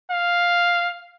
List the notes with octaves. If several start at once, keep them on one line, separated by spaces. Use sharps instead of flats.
F5